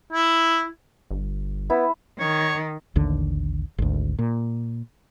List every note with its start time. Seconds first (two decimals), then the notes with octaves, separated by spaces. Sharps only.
0.13 E4
1.11 G1
1.70 B3 E4
2.19 D#3 C#5
2.96 A1 D#2 D3
3.78 G#1 D2
4.19 A#2